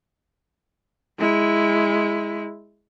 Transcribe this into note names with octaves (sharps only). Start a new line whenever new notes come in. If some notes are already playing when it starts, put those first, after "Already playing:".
G#3 E4